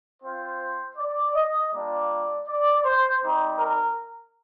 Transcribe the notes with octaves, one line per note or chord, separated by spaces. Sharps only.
C4 F4 C5
D5
D#5
G3 A#3 D4 F4 D5
D5
C5
G3 C4 D#4
A#4